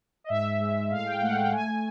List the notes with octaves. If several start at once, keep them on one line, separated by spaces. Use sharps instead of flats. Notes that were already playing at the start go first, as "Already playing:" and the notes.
D#5
G#2 E5
G#3
A2 F5
G5
A3 F#5
G5
A3 G#5